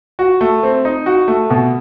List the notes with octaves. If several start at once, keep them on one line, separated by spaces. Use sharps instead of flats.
F#4
A3
C4
D#4
F#4
A3
B2